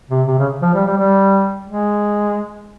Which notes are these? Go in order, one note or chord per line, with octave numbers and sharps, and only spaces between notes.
C3
C3
C#3
F3
G3
G3
G3
G#3